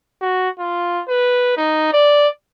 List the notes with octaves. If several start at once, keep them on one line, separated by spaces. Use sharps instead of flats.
F#4
F4
B4
D#4
D5